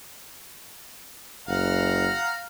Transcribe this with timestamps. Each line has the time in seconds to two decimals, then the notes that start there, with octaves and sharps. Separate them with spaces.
1.48 F#1 F5 F#5 A#5